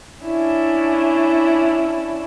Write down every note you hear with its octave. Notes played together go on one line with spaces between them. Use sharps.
C#4 D4 E4